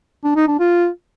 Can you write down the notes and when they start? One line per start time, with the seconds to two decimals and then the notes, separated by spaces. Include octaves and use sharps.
0.24 D4
0.36 D#4
0.48 D4
0.59 F4